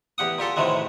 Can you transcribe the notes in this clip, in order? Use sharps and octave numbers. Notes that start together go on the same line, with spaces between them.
E2 G4 F#5 D#6
A#2 G4 A4 C6
A2 C3 D#3 E3 F#3 G#3